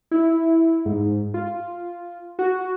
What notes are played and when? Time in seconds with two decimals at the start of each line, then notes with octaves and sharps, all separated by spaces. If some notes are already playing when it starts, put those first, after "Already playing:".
0.11 E4
0.86 G#2
1.34 F4
2.39 F#4